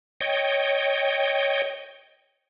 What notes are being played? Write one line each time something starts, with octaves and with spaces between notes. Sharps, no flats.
C#5 D#5 G5